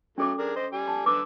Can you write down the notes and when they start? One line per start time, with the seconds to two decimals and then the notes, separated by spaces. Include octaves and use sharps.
0.18 F#3 A3 C#4 A4 D6
0.39 D4 G#4 A#4
0.56 C5 D#5
0.73 G3 G#5
0.88 A5
1.06 D3 B4 D6 E6